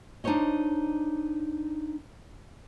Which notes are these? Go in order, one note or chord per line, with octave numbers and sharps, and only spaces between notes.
D4 D#4 F4 C5 C#5 D#5